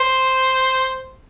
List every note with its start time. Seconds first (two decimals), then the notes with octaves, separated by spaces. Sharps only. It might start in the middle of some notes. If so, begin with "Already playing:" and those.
Already playing: C5